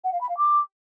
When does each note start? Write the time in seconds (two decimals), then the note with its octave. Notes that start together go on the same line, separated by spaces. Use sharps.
0.04 F#5
0.12 F5
0.21 B5
0.29 F5
0.37 D6